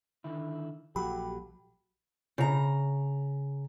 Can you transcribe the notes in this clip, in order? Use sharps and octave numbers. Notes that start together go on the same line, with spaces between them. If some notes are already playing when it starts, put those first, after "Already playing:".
D3 D#3 E4
A#1 F#3 F#4 G4 A4 B5
C#3 A#5